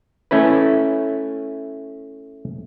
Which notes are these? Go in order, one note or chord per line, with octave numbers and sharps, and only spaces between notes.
A3 C#4 E4 B4